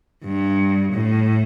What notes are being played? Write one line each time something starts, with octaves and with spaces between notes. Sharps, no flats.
G2
A2